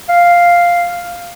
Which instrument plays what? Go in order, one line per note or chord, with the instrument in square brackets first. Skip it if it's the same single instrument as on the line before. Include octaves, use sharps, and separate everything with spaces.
[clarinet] F5